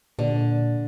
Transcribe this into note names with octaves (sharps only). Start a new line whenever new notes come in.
A#2 D3